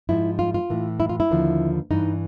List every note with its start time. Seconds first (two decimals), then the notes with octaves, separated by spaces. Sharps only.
0.09 G#2 F3 E4
0.39 F4
0.54 F4
0.70 A2 E3
1.00 E4
1.09 F4
1.20 E4
1.31 D#2 D3 F3
1.91 G2 E3 D#4